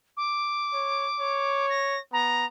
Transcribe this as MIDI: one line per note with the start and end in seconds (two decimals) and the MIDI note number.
0.17 1.66 86
0.73 1.07 73
1.20 2.00 73
1.70 1.99 94
2.13 2.47 59
2.13 2.45 82